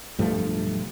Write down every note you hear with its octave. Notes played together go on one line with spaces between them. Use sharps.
B1 G2 F3 A3